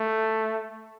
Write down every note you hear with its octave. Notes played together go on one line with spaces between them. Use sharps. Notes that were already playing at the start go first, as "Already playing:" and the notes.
Already playing: A3